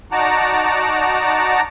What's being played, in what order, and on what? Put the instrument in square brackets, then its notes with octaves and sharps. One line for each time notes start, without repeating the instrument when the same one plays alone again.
[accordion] D#4 F#4 D5 F#5 A5 A#5